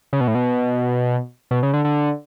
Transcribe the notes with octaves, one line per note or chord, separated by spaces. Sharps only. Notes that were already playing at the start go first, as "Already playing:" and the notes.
C#3
B2
A2
B2
B2
C#3
D3
D3